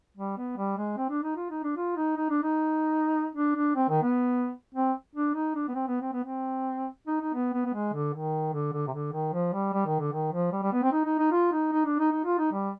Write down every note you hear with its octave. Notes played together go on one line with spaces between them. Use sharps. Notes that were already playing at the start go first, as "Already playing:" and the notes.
G3
B3
G3
G#3
C4
D4
D#4
F4
D#4
D4
F4
D#4
D#4
D4
D#4
D4
D4
C4
D#3
B3
C4
D4
D#4
D4
B3
C4
B3
C4
B3
C4
D#4
D#4
B3
B3
B3
G#3
D3
D#3
D3
D3
C3
D3
D#3
F3
G3
G3
D#3
D3
D#3
F3
G3
G3
B3
C4
D#4
D#4
D#4
F4
D#4
D#4
D4
D#4
D#4
F4
D#4
G3